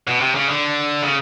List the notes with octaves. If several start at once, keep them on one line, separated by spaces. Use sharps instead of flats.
B2
C3
C#3
D3
C#3